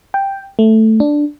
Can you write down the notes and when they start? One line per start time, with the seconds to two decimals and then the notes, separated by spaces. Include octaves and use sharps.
0.14 G5
0.59 A3
1.00 D4